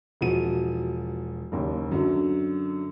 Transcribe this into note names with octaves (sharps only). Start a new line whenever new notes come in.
E1 F3 F#4 D#7
F#1 D#2
F#2 D3 F#3